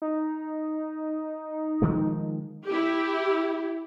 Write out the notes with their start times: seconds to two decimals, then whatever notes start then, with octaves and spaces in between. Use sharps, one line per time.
0.02 D#4
1.82 D#3 F3 G#3
2.67 E4 G4